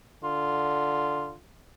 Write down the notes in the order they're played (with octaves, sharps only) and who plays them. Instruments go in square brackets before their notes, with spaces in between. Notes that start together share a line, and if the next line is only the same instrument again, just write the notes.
[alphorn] D3 [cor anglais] F4